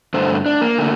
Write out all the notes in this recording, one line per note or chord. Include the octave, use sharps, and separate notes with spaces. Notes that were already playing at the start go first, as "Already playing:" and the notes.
G2 D3 A3 C5
D4
A#3
D3 A3